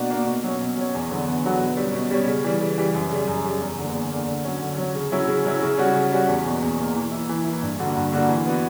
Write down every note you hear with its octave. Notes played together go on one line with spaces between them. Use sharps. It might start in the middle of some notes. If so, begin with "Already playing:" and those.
Already playing: B2 A#3 D4 F#4
A#3 D4 F#4
B2
F#3 C#4
B2
F#3 C#4
E2
D3 F#3 B3 F#4
E2
D3 F#3 B3 F#4
B2
G3 C#4
B2
G3 C#4
C#3
E3 G3
C#3
E3 G3
F#2
C#3 G3
F#2
C#3 G3
E2
D3 A#3
E2
D3 A#3
D3
F#3 C#4
D3
F#3 C#4
C#3
F#3 C#4 E4
C#3
F#3 C#4 E4
C#3
G3 C#4 F#4
C#3
G3 C#4 F#4
E2
B2 A#3
E2
B2 A#3
E3
A#3 E4
E3
A#3 E4
G2
D3 A#3 D4 F#4
G2
D3 A#3 D4 F#4
E3
B3 F#4